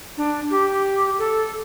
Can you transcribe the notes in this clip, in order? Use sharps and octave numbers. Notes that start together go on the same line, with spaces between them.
D4
G4
A4